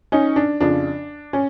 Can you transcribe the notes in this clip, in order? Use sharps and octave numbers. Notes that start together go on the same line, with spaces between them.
C#4 D#4
D4
F2 C#3 F3 D4
C#4